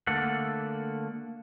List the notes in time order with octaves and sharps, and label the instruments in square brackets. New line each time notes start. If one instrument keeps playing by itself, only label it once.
[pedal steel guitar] D3 A3 A#3 A4 F#5